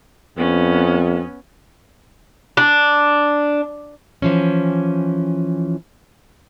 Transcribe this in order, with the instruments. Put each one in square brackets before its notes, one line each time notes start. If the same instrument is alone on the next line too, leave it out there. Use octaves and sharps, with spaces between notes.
[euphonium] F2 [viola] B3 C#4
[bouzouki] D4
[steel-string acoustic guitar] E3 F3 C#4